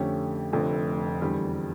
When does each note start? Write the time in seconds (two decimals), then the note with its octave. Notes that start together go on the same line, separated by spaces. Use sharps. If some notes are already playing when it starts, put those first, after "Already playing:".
Already playing: F2 D3 A3 C#4 G4
0.52 F1 F2 D3 A3
1.21 E2 D3 G3